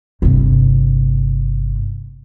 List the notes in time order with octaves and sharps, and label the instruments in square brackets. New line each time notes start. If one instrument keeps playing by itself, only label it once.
[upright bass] G1 C3